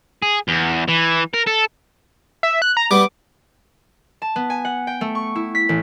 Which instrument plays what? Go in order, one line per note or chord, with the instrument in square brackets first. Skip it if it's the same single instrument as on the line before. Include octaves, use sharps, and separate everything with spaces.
[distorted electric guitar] G#4
E2
E3
A#4
A4
[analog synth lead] E5
F#6
A#5
[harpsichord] G3 B3 [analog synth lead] D6
[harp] A5
B3
G#5
F#5
G5
A3
C#6
E4
B6
A1